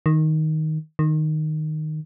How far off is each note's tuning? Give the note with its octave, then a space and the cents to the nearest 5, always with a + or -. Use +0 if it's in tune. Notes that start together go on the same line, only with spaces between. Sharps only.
D#3 +5
D#3 -10